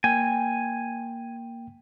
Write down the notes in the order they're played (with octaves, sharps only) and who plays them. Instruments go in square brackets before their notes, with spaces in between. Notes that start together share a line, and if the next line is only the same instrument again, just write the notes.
[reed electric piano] A#3 G5 [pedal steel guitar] G#5